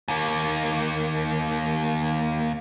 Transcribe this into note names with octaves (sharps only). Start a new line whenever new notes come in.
D#2 A#3